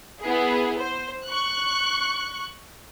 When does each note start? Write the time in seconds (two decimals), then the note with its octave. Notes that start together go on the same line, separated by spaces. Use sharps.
0.21 B3 E4 G#4
0.78 C5
1.26 C#6 F#6